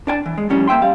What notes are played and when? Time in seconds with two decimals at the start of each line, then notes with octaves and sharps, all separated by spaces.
0.07 D4 D5 G#5 A5
0.26 E3
0.38 G#3
0.50 A2 F3 G3 C#4
0.68 A#3 C5 E5 G5 C6
0.82 F#2 G3 F5